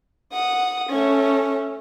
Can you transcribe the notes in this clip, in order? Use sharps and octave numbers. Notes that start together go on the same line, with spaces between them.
F#5 D#6
A3 C#4